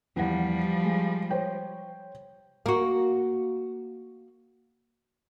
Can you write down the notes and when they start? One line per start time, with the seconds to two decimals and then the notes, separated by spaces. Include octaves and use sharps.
0.16 E2 F3 G3 F#5
0.84 G#3
1.31 C5 C#5 G5
2.66 A#3 F#4